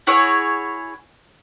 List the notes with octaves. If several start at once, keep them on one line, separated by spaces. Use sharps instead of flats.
E4 F#4 G#4 C#5